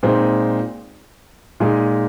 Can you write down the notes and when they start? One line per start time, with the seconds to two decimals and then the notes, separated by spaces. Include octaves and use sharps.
0.03 A#2 G#3 C4 D#4
1.60 A#2 G#3 D#4